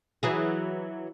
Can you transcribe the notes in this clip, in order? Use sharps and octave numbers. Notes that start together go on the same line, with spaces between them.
E3 F#3 G#4